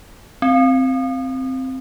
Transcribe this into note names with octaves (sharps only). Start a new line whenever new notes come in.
C4